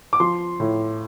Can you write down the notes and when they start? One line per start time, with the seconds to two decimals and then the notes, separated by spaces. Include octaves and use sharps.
0.13 D6
0.20 F3 C6
0.60 A2